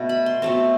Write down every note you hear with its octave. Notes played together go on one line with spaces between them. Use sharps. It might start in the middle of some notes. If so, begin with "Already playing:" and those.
Already playing: B2 A3
B5
C6
B2 A3 C4 A5